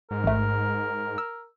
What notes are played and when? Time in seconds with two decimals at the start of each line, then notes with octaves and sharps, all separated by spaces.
0.11 G#2 A#4
0.24 A1 A3
1.18 E6